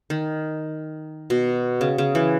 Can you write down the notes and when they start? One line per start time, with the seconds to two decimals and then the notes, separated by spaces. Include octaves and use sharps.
0.10 D#3
1.30 B2
1.81 C#3
1.98 C#3
2.15 E3